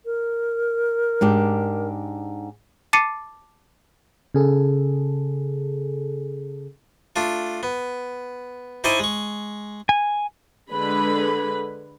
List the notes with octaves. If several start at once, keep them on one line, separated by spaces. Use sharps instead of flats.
A#4
G#2 D4 G4
A5 D6 A6 C7 C#7 D#7
C#3 G#4 A4
A3 D4 F4
B3
D#4 E4 C5 D5 G#5 C#6
G#3 C#6
G#5
D3 G#3 G#4 B4 B5